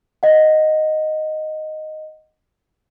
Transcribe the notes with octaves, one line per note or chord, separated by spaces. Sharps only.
D#5 F#5